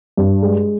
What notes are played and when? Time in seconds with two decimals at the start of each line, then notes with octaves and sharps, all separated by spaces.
0.17 G2
0.43 G#3